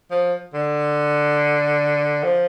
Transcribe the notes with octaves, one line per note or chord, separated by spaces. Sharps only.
F3
D3
F3